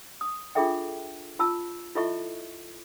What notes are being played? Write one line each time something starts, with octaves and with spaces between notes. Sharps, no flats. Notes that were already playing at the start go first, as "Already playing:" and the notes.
D#6
D4 F4 G#4 A4 E5 G5
F4 A5 E6
E4 F4 A4 D#5 E5 C#6